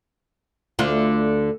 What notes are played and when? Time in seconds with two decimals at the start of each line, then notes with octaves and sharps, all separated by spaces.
0.79 D2 D3 F4